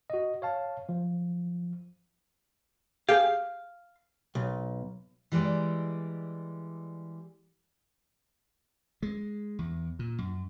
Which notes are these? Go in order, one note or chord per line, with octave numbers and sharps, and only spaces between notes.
F#4 D#5
C#5 F5 A5
F3
G4 G#4 F5
B1
E3 G3 G#3 D5
G#3
E2
A#2
F#2